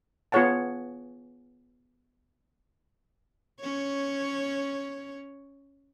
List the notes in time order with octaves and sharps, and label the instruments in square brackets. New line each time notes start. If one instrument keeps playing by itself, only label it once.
[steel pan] B3 F4 G#4 C#5 F#5 A5
[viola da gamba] C#4 C#5